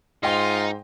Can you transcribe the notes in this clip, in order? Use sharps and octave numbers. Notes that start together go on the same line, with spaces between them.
G#2 D#4 F4 D#5 G5 C6